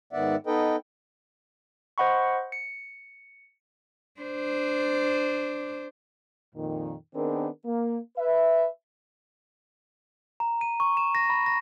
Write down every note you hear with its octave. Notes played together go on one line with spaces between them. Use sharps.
G#2 D#3 B3 D5 E5 F#5
B3 D#4 A4 B4 D#5 G5
C5 D#5 F#5 B5 C#6
C#7
D4 C5
F2 A#2 D#3
D#3 B3 C4 D4 G#4 A#4
A#3
B4 E5
A#5
D#7
C#6
E7
A#6
B5
A#6